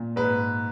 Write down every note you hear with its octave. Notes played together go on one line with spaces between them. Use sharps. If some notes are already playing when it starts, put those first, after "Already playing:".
Already playing: A#2
G#2 B4